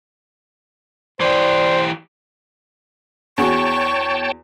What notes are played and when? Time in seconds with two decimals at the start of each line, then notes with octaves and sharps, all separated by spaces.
1.20 E3 G4 C5 D5
3.38 E2 F#4 G#4 C#5 G5 A5 C#6